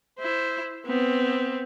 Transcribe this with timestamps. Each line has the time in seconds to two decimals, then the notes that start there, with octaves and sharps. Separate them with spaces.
0.19 E4 C5
0.86 B3 C4